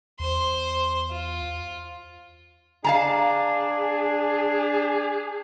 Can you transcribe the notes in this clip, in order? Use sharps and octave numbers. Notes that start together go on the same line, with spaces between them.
E2 C5 C6
F4
D4 G#4 F5 A5 A#5